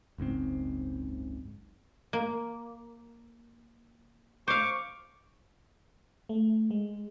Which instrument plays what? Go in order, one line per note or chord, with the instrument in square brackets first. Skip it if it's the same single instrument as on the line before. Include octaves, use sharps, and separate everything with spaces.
[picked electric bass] F#1 C#2 G#2 C4
[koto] A#3
[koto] C5 F5 [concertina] C#6 D6
[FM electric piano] A3
G#3